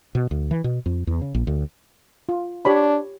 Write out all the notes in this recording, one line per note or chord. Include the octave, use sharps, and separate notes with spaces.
B2
D2
E3
B2
F2
E2
C#3
A#1
D2
F4
D4 G4 C#5 B5